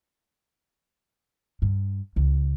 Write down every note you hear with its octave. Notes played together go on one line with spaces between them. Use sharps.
G2
C#2